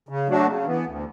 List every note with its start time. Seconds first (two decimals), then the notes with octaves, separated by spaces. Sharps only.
0.09 C#3
0.28 F#3 A3 D4 F#4
0.47 C#3
0.66 E3 B3
0.86 D2